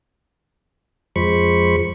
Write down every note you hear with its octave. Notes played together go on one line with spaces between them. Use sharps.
F2 F3 G#3 C5 B5 C#6